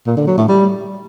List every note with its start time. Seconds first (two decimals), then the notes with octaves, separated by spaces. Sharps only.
0.06 A#2
0.17 D3
0.27 F#3
0.38 A2
0.48 G3